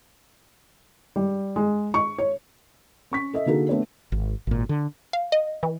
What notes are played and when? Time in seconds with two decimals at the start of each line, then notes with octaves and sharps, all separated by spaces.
1.16 G3
1.56 G#3
1.94 C#6
2.18 C#5
3.11 C#4 C#6 B6
3.34 A4 D#5 E5
3.46 D3 A#3 D#4 F#4 G#4 A4
3.69 A3 B3 D4 C#5
4.12 G#1
4.47 G#1 A#2
4.69 D3
5.13 F5
5.32 D#5
5.63 E3